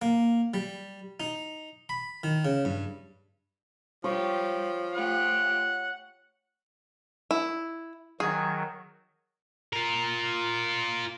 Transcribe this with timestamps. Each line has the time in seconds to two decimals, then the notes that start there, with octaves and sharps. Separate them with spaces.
0.02 A#3
0.54 G3
1.20 D#4
1.89 B5
2.24 D#3
2.45 C#3
2.65 G2
4.04 F3 G3 G4 C#5
4.94 A3 F4 G4 F#5
7.31 E4
8.20 D#3 F#3 G#4
9.73 F4 A#4